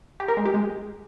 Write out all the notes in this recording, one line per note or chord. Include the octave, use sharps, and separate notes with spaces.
G4
A#4
G#3
G4
G#3